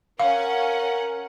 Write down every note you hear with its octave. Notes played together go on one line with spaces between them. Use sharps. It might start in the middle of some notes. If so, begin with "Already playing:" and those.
C#4 A#4 F5 F#5